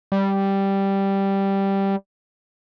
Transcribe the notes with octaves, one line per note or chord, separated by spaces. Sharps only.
G3